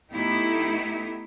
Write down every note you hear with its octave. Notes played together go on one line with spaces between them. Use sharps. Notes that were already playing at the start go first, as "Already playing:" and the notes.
A3 B3 D#4 E4 G4